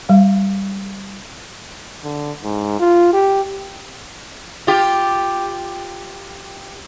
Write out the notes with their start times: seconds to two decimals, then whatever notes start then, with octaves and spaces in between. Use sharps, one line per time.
0.09 G3 F5
2.04 D3
2.44 G#2
2.79 F4
3.13 G4
4.67 F4 G4